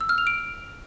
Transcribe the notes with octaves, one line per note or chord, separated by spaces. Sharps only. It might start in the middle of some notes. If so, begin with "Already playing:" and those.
E6
F6
F7
D7